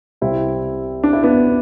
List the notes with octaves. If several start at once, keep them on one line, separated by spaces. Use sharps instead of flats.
C2 C3 G3 C4 E4
D4
E4
B3 D4